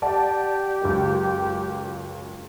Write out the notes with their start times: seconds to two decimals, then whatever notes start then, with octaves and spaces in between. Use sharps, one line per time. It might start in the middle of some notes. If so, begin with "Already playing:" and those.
0.02 G4 D5 F#5 A5
0.82 C#2 F#2